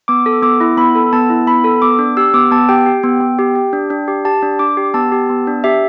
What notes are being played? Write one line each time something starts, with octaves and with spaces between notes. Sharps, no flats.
B3 D6
A4
B3 D6
E4
B3 B5
A4
B3 A5
E4
B3 B5
A4
B3 D6
D4
G4 E6
B3 D6
B3 A5
G4 G5
G4
B3
B3
G4
G4
D4
D4
G4
G4 A5
D4
D4 D6
G4
B3 A5
G4
B3
D4
G4 E5